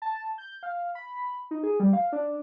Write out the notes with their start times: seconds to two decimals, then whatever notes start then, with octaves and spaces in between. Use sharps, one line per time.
0.02 A5
0.38 G6
0.63 F5
0.95 B5
1.51 D#4
1.63 G#4
1.80 G3
1.93 F5
2.13 D4